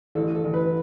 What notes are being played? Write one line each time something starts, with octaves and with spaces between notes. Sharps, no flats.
A1 A4
A4
A1
B4